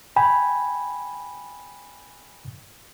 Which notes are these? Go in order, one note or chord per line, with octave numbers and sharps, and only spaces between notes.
G5 G#5 B5